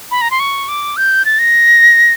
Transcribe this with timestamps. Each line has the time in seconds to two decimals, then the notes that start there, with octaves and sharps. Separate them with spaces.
0.11 B5
0.21 A#5
0.31 C6
0.40 C#6
0.68 D6
0.97 G6
1.25 A6
1.39 A#6